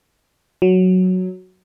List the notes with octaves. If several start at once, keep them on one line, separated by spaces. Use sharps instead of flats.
F#3